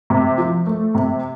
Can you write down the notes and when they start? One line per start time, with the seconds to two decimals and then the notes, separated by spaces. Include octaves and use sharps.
0.10 C3
0.38 F3
0.66 A3
0.95 C3